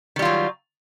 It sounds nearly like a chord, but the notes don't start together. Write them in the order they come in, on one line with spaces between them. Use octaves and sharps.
D#3 G3 F4 F#3